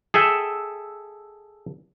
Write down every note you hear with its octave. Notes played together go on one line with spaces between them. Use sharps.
G#4 A4 E5 G5